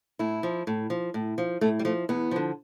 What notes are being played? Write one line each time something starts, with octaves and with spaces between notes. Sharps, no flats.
A2 E4
F3
A2
F3
A2
F3
A2 A3
G3
F3 A3
E2 B3
D3 F3